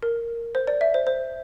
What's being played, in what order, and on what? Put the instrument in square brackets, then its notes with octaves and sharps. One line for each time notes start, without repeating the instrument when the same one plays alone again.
[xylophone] A#4
C5
D5
E5
C5
C5